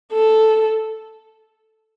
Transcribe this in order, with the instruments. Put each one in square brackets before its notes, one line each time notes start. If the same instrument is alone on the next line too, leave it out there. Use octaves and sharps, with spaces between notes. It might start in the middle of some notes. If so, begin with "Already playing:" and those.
[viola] A4